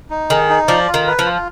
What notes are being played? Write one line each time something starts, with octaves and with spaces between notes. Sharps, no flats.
D#4
D#3 G#4
D#4
F3 D5
F4
D#3
B4
F3
F4